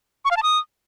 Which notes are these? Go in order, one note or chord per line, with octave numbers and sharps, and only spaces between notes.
C#6
F5
A5
D#6